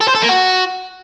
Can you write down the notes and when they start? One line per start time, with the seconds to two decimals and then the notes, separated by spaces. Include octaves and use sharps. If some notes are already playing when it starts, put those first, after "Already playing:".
0.01 A4
0.08 C5
0.15 A4
0.22 A#3
0.29 F#4